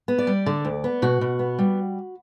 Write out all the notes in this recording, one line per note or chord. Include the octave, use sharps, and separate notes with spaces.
B3
D5
G3
D3
D2
B3
B2 F#4
B2
B3
G3